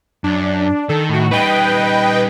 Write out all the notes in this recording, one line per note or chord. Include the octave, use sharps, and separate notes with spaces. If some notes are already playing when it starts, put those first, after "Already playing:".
F#2 D4
D#3 A4
A2 F#4
G3 D#4 B4 D#5 G5